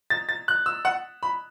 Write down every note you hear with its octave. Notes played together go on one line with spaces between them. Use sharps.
A6
A6
F#6
E6
F#5
B5